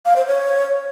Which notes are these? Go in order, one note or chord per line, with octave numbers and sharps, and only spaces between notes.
F5
C5
C#5